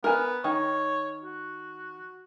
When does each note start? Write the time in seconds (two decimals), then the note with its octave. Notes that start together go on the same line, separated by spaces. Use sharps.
0.04 B3 A#4 G#5
0.44 D#3 C#5
1.23 F#4